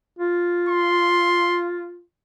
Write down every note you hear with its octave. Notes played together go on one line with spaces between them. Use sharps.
F4
C6